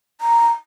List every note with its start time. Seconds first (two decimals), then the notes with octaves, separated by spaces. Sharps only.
0.21 A#5